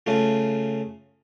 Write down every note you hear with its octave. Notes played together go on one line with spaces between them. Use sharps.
C#3 A3 F4